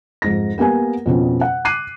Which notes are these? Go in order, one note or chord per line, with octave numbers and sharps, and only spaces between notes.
F2 G#2 A#6
A#3 B3 G4 A#4 G#5
F2 B2 C#4 F4
F#5
D6 F#6 C7 D#7